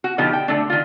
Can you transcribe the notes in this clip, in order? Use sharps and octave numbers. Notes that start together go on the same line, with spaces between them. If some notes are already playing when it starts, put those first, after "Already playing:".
F#4
B2 D3 F3 D#4 F4 G4
G5
D3 A3 D4
D#3 F4